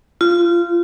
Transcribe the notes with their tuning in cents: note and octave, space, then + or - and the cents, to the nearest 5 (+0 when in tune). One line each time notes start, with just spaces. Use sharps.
F4 -20